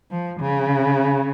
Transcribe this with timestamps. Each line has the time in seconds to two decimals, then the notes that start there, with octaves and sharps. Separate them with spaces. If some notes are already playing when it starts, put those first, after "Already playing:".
0.11 F3
0.40 C#3